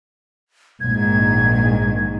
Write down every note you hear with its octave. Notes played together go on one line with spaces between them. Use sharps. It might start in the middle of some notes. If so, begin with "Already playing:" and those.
A#1 G#2 D#3 G#6